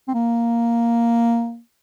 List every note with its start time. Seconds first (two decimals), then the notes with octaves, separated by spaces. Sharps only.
0.08 C4
0.14 A#3